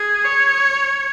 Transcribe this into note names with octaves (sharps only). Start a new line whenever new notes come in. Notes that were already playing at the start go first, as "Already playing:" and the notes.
Already playing: G#4
C#5